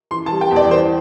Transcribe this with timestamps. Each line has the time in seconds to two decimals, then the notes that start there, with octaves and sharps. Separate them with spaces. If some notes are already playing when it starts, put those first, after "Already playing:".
0.11 E3 C6
0.26 A5
0.31 G3
0.41 G5
0.51 E2
0.56 D5
0.71 E3 C5